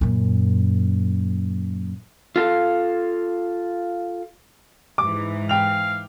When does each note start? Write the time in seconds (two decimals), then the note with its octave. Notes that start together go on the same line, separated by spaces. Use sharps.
0.01 F#2 A#2
2.36 F4 A4 F5
4.98 G#2 E3 D6
5.49 F5 G5 F7